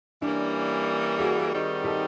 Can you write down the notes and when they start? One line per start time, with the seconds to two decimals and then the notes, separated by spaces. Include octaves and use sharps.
0.22 E3 G3 A#3 C#4 D4
1.19 F#4 G#4
1.52 D#3 G3 C4 D#4
1.84 G4 A4